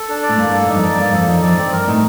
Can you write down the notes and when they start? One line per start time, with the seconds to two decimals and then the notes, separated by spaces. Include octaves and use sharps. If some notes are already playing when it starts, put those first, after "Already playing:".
Already playing: A4
0.09 D4
0.23 D5
0.29 A2
0.37 G2 A#3
0.53 A4
0.68 G2 D#4
0.75 F2
0.83 G2 D5
0.97 G2 A#3
1.12 F2 A4
1.27 F2 D#4
1.42 F2 D5
1.57 G2 C4
1.72 A#4
1.88 A2 D#4